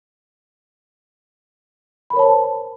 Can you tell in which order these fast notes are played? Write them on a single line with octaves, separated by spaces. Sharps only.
B5 A#4 C#5 A5 C5